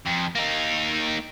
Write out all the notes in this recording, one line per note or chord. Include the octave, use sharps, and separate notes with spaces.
F2
A#3 D#4